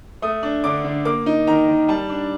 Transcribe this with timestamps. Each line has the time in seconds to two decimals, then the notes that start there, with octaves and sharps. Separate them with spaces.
0.22 A3 D#6
0.43 D4
0.64 D3 D6
0.84 D3
1.05 A#3 D6
1.26 D#4
1.47 D#3 A#5
1.68 D#3
1.88 G3 A5
2.09 D4